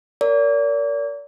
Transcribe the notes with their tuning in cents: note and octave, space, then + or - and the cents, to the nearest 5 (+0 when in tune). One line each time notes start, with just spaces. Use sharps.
A#4 -10 D5 -40